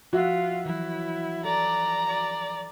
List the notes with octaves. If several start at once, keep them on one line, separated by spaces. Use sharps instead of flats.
F3 F4 F#4 E5 F#5
E3 F#3 E4
A4 D5 A#5
D5